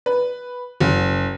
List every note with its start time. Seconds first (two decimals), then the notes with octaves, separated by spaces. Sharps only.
0.06 B4
0.80 F#1